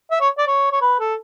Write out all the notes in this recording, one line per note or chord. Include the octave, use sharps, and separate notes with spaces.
E5
C#5
D5
C#5
C#5
B4
A4